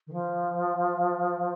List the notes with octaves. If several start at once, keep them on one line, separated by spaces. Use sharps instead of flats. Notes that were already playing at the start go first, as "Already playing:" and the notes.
D#3
F3